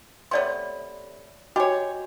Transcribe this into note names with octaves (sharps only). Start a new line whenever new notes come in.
C3 A3 B3 C#5 D5 C6
F#4 G4 C#5 D#5 G#5